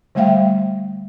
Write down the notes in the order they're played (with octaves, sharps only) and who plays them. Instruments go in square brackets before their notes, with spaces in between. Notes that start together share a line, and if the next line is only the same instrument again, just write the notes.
[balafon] D3 G3 A3 E5 F5 G5